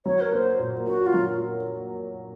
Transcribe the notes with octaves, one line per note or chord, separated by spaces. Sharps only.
F#3 C#5
A#4
A#3 C5
A#2
A#3 F#4
F4
F#3